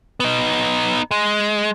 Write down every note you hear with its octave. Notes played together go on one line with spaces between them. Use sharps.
B3 D#4
G#3